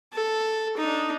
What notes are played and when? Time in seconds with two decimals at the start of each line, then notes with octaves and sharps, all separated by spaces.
0.13 A4
0.77 D4 D#4